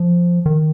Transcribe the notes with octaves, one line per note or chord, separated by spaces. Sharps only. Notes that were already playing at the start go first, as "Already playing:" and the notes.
Already playing: F3
D#3